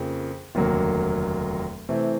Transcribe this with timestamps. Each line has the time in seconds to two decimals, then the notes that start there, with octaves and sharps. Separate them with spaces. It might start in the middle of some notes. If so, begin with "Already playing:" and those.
Already playing: F2 C#3 F3 A#3
0.55 F1 D#2 D3 F#3 A#3
1.89 C3 E3 A3 C4